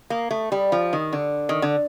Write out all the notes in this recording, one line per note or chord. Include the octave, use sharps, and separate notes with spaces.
A#3
A3
G3
F3
D#3
D3
D#3
D3